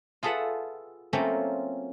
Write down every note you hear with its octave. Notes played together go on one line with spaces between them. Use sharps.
F4 G#4 A4 B4 E5 F#5
F#3 A3 A#3 C4 C#4 F4